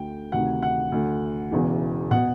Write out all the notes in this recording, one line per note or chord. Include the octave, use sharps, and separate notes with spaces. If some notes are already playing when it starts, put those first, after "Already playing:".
Already playing: D2 D3 G5
D2 C3 D#3 F#5
F#5
D2 D3
E1 E2 C#3 E3
B2 F#5